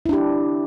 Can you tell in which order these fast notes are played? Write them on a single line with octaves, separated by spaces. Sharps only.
E4 D4 G4